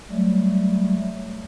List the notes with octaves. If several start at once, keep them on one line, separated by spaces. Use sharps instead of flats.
F#3 G3 A3